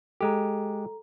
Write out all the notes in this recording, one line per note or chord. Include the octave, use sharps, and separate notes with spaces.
G#3 G4 A4 A#5